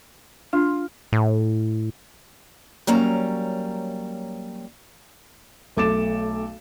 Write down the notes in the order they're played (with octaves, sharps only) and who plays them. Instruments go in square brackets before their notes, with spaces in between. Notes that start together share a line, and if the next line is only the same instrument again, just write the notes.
[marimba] D4 [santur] F4
[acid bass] A2
[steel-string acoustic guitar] F#3 G3 A#3 C#4 A#5
[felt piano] B1 A3 D6 A6 E7